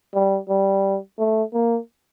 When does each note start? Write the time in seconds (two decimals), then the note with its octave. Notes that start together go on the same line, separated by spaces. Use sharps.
0.14 G3
0.49 G3
1.18 A3
1.54 A#3